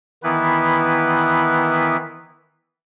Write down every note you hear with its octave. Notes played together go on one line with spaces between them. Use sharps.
D#3 E3 B3 E4 B4